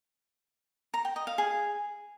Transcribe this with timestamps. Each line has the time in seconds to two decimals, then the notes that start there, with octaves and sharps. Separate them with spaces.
0.94 A#5
1.05 G5
1.16 D#5
1.27 F5
1.38 G#4